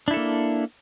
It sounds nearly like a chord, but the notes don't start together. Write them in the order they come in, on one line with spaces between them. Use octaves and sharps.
D4 E4 A4 A#3